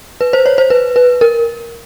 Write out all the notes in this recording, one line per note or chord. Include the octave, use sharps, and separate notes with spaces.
B4
C5
C#5
C5
B4
B4
A#4